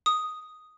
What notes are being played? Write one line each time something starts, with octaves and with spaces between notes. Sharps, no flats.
D#6